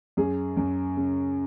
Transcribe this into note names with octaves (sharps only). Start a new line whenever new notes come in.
F#2 G#4
F#2
C#3